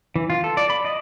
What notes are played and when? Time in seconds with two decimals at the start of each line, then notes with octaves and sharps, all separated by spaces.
0.16 E3
0.30 F4
0.44 A4
0.57 D5
0.70 B5
0.85 D#5